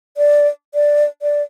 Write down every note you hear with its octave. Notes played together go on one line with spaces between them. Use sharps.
D5
D5
D5